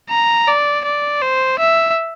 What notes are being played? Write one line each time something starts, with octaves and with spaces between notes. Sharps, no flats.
A#5
D5
D5
C5
E5